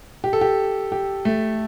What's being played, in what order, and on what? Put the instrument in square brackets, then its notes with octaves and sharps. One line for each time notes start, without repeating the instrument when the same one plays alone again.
[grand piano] G4
A4
G4
G4
A3